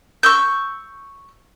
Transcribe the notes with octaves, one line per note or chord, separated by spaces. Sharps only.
C#6 E6 G6